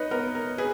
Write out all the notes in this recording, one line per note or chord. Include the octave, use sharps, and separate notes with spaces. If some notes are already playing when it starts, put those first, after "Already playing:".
Already playing: D#4 B4 C#5 D#5
B3 A#4
A#4
G#4 B4